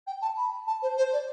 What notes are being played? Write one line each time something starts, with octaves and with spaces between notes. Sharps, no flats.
G5
A5
B5
A5
C5
C5
D5